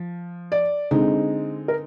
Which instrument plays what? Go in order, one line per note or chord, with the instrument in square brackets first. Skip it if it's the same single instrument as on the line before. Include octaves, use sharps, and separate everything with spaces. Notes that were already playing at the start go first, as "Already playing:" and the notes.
Already playing: [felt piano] F3
D5
D3 G#3 C4 D#4
A#4